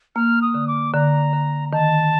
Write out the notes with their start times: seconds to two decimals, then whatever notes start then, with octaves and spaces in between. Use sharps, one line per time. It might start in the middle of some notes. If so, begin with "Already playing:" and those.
0.16 A#3 F6
0.42 D#6
0.54 D3
0.68 D6
0.94 D3 A#5
1.33 D3
1.72 D#3 A5